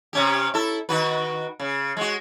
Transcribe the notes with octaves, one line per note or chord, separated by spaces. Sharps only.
C3 C#4 G4
E4 A4
D#3 F#4 B4
C#3
G#3 F#4